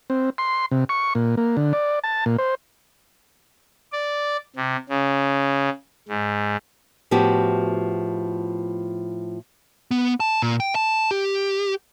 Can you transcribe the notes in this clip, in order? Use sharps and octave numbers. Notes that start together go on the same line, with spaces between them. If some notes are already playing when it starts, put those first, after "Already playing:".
C4
C6
C3
C#6
A#2
A#3
D3
D5
A5
A#2
C5
D5
C3
C#3
G#2
A2 F3 B3 F#4 G4
B3
A5
A#2
G5
A5
G4